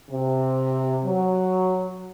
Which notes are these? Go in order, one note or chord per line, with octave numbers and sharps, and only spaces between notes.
C3
F#3